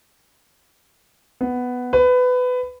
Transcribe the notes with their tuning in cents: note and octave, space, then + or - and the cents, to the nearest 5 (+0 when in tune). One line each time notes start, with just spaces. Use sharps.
B3 +5
B4 +20